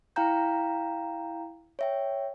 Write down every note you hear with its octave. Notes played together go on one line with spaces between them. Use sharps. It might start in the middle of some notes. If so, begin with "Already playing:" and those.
E4 F5 G5 A#5 G6
C#5 E5 G5